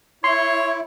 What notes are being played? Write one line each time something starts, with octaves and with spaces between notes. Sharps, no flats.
E4 C#5 C6